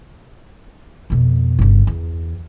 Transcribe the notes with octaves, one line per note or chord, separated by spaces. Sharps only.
F2 B2
G1 C#3
E2